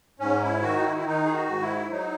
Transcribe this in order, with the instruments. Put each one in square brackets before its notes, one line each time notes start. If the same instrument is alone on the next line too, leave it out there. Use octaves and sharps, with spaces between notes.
[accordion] G#2 C#4
E4
D#3 F#4
D#4
E4
E4
D#3 D#4
G#4
F#4
G#2
E4
F#3 D#4